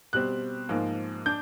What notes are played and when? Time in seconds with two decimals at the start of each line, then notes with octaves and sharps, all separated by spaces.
0.13 B2 G3 C4 F#6
0.69 G#2 F3 A#3
1.26 D4 G6